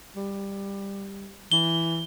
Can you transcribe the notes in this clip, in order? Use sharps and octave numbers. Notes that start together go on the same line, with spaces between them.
G3
E3 G7